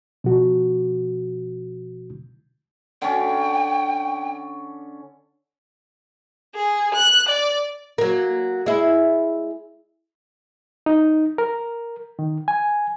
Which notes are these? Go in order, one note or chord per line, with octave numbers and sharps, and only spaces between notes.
B2 F3 F#4
D3 C#4 G5
G#4
F#6
D5
F#3 A#3
G#3 E4
D#4
A#4
D#3
G#5